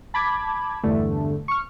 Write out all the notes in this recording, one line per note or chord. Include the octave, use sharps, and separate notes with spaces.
A5 B5 D6 G#6
E2 G2 D3 A3
C#6 F6